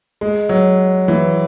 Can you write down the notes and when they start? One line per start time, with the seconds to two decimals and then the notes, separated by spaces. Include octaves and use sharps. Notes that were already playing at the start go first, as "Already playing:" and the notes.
0.21 G#3
0.49 F#3
1.08 E3